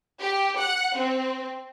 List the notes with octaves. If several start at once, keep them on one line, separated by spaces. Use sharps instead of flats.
G4
F#5
C4